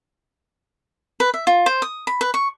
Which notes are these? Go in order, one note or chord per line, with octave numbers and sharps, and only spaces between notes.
B4
E5
F4
C5
D#6
B5
B4
C#6